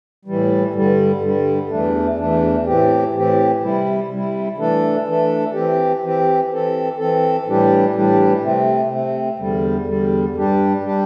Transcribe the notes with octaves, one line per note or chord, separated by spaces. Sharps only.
A2 E3 G3
G2 D3 G3
G2 D3 G3
E2 E3 A3 D4
E2 E3 A3 D4
A2 E3 C4 G4
A2 E3 C4 G4
C3 G3 E4
C3 G3 E4
E3 A3 D4 A4
E3 A3 D4 A4
E3 C4 G4
E3 C4 G4
E3 C4 A4
E3 C4 A4
A2 E3 G3 D4 G4
A2 E3 G3 D4 G4
C3 A3 C4
C3 A3 C4
E2 D3 G3
E2 D3 G3
G2 G3 D4 G4
G3 D4 G4